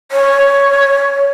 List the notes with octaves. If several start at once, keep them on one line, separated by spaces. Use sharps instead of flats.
C#5